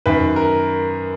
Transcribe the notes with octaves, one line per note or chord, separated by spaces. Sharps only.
F#2 D#3 B4
A#4